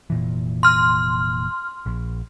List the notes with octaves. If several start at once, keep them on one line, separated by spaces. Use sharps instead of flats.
F1 A#2 E3
C6 F6
A#1